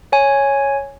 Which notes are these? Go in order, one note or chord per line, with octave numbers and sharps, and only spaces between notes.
C#5 G#5